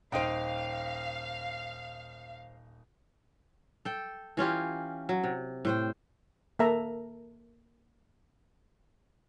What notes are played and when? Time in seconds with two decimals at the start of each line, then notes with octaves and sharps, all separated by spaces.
0.12 D#1 D#4 C5 F5 G5 D7
3.85 A4 G5
4.37 E3 C#4 F4 G4
5.09 F#3
5.24 C3
5.65 A2 C5 G5
6.59 A#3 A4 E5 A#5